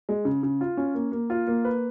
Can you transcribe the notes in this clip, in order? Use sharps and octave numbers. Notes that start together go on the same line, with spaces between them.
G#3
C#3
C#3
F4
C#4
A#3
A#3
F4
A#3
B4